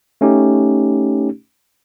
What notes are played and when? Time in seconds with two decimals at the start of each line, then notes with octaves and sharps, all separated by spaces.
0.21 A3 C#4 D#4 G4